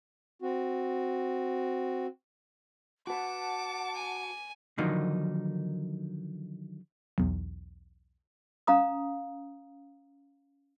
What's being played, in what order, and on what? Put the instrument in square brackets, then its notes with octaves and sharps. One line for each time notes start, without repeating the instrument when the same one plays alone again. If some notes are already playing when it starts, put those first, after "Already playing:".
[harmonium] C4 F#4
[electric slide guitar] F#4 B4 [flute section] F#5 A5 [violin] D6
[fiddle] G#5
[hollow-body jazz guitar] D3 D#3 F3 F#3 A#3 D#4
[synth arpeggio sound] B1 E2
[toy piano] C#4 F5 A#5 D#6